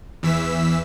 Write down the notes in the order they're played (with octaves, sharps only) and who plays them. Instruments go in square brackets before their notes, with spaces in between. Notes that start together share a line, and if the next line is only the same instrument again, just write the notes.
[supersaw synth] E2 E3 E6 B6